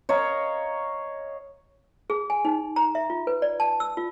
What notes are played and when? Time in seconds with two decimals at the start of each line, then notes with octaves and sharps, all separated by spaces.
0.09 C#5 D#5 F5 A#5
2.10 G#4
2.30 G#5
2.45 D#4
2.76 A#5
2.95 E5
3.10 F4
3.27 B4
3.42 D5
3.60 A5
3.80 E6
3.97 F4